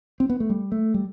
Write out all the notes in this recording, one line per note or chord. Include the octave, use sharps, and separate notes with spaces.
C4
B3
A3
G3
A3
G3